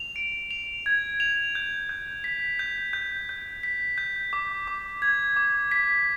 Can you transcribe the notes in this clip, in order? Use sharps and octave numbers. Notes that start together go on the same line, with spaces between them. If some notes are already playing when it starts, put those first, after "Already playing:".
Already playing: F7
D7
F7
G#6
F7
G6
G6
B6
G6
G6
G6
B6
G6
D6
D6
G#6
D6
B6